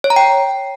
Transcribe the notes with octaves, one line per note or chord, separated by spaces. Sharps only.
C#5
A#5
G5